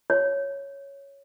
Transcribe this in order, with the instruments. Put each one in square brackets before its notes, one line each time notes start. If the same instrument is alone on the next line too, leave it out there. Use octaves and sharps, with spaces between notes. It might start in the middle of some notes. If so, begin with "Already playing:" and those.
[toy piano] C#5